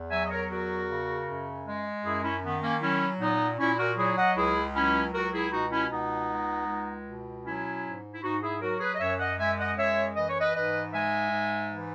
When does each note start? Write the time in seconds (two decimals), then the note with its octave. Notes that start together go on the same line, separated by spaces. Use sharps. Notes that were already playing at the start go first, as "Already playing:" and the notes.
Already playing: E2
0.10 F#3 E5 G#5
0.24 D#5
0.30 A#4 C#5
0.50 E2 F#4 A#4
0.89 C#3
1.27 F#2
1.66 G#3
2.04 F#2 E4 G#4
2.23 C#4 E4
2.43 D#3 B3
2.62 A#3 C#4
2.81 F#3 C#4 E4
3.20 A#2 B3 D#4
3.59 A#2 C#4 E4
3.78 F#4 A#4
3.97 F#3 E4 G#4
4.17 D#5 F#5
4.36 C#2 E4 G#4
4.75 F#3 C#4 E4
5.14 C#2 F#4 A#4
5.33 E4 G#4
5.52 B2 D#4 F#4
5.71 C#4 E4
5.90 C#2 B3 D#4
6.30 G#3
6.68 C#2
7.06 B2
7.45 F#3 C#4 E4
7.84 G#2
8.13 E4
8.22 G#2 D#4 F#4
8.42 E4 G#4
8.61 F#3 F#4 A#4
8.80 G#4 B4
8.94 D#5
9.00 F#2 C#5 E5
9.19 D#5 F#5
9.38 G#3 E5 G#5
9.58 D#5 F#5
9.77 F#2 C#5 E5
10.16 E3 D#5
10.28 C#5
10.40 B4 D#5
10.54 G#2 B4 D#5
10.93 G#3 E5 G#5
11.32 G#2
11.71 E3